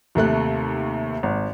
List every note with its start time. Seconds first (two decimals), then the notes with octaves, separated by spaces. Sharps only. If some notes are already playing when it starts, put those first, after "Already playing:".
0.15 D#2 C3 A3 F#6
1.23 G#1